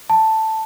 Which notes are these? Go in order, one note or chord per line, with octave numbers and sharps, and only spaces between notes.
A5